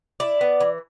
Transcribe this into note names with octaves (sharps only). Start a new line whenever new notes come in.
E4 D5
B3
E3